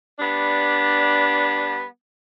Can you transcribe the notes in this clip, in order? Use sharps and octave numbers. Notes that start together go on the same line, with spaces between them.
G3 B3 D4